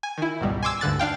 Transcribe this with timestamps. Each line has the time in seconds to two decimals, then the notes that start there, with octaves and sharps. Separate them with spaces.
0.03 G#5
0.18 D#3 E4
0.41 G#1 C#2 B2 G3
0.63 G#5 C6 D6 E6 G#6
0.81 D2 G2 D3 F#6 A6
0.99 D4 F5 G5